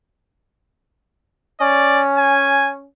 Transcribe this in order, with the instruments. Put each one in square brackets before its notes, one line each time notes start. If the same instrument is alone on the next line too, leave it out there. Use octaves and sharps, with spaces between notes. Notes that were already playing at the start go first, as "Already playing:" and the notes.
[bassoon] C#4 [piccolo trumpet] D5
[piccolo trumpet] G#5